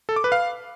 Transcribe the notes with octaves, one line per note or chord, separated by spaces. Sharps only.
A4
D6
B4
F5